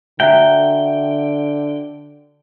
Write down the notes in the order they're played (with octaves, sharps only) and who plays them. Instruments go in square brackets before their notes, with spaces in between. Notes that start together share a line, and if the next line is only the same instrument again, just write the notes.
[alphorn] D3 [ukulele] F#4 E5 A#5 [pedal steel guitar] G5